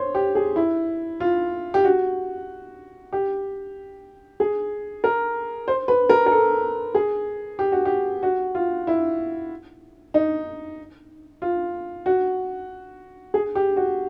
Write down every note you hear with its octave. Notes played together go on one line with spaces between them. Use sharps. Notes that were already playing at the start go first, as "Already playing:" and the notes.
Already playing: C5 C#5
G4
G#4
E4
F4
G4
F#4
G4
G#4
A#4
C5
B4
A#4
A#4
A4
G#4
G4
F#4
G4
F#4
F4
E4
D#4
F4
F#4
G#4
G4
F#4